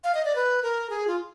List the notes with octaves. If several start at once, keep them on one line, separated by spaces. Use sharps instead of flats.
F5
D#5
D5
B4
A#4
G#4
F4